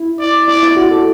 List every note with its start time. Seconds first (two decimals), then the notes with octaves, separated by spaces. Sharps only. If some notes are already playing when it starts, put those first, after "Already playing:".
Already playing: E4
0.20 D5
0.48 E4 D5
0.63 E4
0.77 F#4
0.91 A4